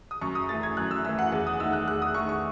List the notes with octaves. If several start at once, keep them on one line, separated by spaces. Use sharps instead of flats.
D#6
F#2 C#6
D#6
E3 A3 A6
G#6
F#2 F#6
E6
E3 A3 E6
F#5
E2 F#5
D#6
D#3 A3 D#4 E6
F#6
E2 F#6
D#6
D#3 A3 D#4 C#6
C#6